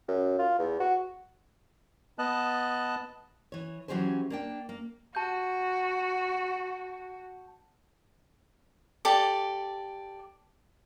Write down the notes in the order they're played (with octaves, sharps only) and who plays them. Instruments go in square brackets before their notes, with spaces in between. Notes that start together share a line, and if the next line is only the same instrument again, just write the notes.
[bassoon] F#2
F4
E2
F#4
[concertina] B3 D#5 A5 F#6
[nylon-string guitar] E3 C#5
E3 F#3 C#4 G4 G#4 C5
A#3 D4 G5
A#3
[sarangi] F#4 [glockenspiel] A5 G6
[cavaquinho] G4 A4 D5